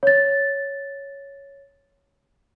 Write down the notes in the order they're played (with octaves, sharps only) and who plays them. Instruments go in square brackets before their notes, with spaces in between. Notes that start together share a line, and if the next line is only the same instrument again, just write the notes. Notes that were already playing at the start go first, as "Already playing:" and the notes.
[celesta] C#5 A6